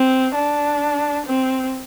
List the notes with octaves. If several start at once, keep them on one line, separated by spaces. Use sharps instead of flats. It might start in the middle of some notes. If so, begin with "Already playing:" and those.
Already playing: C4
D4
C4